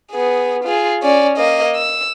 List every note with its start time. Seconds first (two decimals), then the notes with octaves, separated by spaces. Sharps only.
0.11 B3 G#4
0.64 F4 G#4
1.03 C#4 D5
1.38 A#3 D#5
1.76 E6